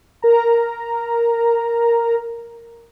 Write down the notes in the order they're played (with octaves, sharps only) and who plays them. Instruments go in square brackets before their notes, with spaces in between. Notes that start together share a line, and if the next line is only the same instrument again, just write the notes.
[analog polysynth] A#4 A#5